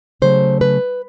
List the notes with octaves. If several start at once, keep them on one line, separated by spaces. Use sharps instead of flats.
C#3 F#3 A3 C5
B4